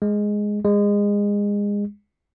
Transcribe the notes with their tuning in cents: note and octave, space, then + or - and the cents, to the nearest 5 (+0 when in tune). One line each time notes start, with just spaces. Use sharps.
G#3 +0
G#3 -25